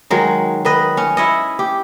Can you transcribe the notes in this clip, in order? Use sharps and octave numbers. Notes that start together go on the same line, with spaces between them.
D#3 F#3 G#3
D#3 B4 D#5
C#4
E4 C#5 D#5
G4